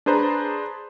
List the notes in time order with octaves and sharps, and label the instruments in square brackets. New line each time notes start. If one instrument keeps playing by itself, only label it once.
[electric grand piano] D4 G#4 B4 C5 A5 A#5